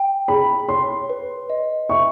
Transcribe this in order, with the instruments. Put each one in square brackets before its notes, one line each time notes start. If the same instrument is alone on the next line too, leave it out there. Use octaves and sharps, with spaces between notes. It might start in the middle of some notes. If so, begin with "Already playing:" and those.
Already playing: [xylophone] G5
[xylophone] G#4 [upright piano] B5
[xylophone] C#5 [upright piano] C6
[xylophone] B4
D#5
[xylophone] E5 [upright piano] C#6